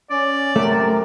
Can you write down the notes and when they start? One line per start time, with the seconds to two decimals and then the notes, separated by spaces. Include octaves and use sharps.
0.10 C#4 D5
0.56 F#2 C3 A3 A#4